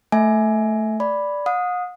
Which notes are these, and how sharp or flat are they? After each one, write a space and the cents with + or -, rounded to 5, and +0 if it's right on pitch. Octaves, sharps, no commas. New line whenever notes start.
A3 +0 E5 -15 G#5 +15
D5 -5 B5 +0
F#5 -45 D#6 +0